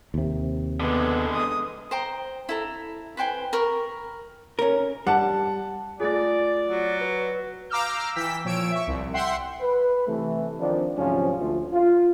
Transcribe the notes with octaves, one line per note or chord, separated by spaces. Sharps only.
D#2 C3
D3 G#3 B3 A4
D#6
C5 G5 A#5
E4 A4 A#5
B4 C5 G5 G#5
A#4 B5 C#6
C#4 A#4
G3 F#5 A5
A3 F4 G#4 D5 A6
F#3
B4
F5 A#5 D6 E6 F6 G6
E3 G5 E6 B6
A#2 F3 C#5 E6 D7
E5 C#6
C2
E5 F#5 G5 C6 C7
B4
C3 E3 A3
D#3 F3 C4 D4
D2 G#2 C3 F3 F#3 C#4
D2 A3 F4
F4